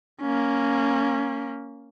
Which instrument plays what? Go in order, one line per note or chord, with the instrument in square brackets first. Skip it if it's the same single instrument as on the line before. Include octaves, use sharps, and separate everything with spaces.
[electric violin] A#3 C#4